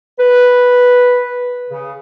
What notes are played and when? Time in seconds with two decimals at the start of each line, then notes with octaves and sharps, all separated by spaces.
0.19 B4
1.69 C#3